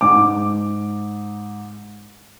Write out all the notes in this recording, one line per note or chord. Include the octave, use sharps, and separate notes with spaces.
G#2 D6